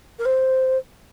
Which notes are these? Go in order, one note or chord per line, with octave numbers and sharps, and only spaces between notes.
A#4
C5